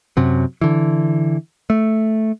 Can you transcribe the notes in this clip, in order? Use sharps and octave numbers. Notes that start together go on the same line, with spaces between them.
F#2 C3 F#3
D3 E3
A3